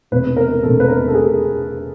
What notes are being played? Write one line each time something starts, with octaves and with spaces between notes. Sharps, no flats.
E1 E2 C3 B4
A#4
E1 E2 C3 A4
B4
A#4
A4
G#4